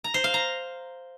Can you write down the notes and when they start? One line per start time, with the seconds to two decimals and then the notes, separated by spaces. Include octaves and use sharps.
0.04 A#5
0.14 C5
0.24 F5
0.34 A#5